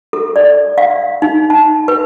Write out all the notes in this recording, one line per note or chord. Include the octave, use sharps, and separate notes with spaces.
A4
D5
F5
D#4
A5
B4